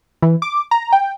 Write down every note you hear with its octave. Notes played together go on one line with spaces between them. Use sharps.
E3
D6
A#5
G5